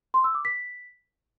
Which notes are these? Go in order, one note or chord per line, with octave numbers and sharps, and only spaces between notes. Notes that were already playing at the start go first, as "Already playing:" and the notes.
C6
E6
D6
B6